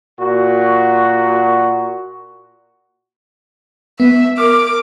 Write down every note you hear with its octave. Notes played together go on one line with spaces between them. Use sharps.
A#2 F#4
B3 E5
A#4 D6 F6